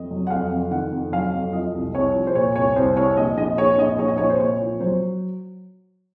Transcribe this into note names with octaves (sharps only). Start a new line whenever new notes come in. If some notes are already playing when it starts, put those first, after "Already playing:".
Already playing: F2 D#5
F#3
F#5
F2 F5
F2
D#3 F#5
F2
F#3 F5
F2
F3 D#5
C2
C2 C#5
F3
C5
A#2 C#5
C2 C#5
C2 C5
C2 C#5
A#1 D#5
A#1 D#5
A#1 C#5
A#1 D#5
A#1 C#5
D#5
A#1 C#5
C5
A#2 C#5
F3
F#3 C5